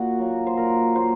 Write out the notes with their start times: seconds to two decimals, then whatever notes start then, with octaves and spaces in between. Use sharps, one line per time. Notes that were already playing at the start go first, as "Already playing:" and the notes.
Already playing: A#2 F#4
0.19 F#3 A#3
0.47 C5
0.57 A#2 A#4
0.96 F#3 A#3 C5